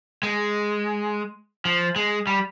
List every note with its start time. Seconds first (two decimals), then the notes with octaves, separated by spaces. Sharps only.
0.23 G#3
1.65 F3
1.96 G#3
2.27 G3